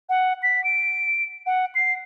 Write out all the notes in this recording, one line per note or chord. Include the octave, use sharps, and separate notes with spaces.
F#5
B6
D7
F#5
C7